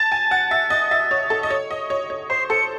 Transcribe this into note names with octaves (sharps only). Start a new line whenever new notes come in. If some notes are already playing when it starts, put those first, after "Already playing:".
Already playing: A5 A6
G#5
F#5
E5
D#5
E5
C#5
A4
D#5
C#5
D#5
C#5
C#5
C5 C7
A4 C#7